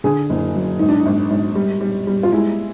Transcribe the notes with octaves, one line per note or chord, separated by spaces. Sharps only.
D3 G#4
F#1
F#2
G#1 D#4
D4
D#4
G#1
G#1
G3
G3
G3
F4
G#3 E4